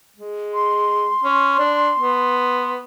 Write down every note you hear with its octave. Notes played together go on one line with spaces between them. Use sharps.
G#3
C6
C#4
D4
B3